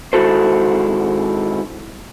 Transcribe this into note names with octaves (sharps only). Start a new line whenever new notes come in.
G#2 D#3 E4 F#4 A4 C5